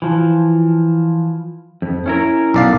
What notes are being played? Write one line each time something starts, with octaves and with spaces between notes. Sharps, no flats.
E3 F3
F2
C#4 E4 A#4
B1 D5 F5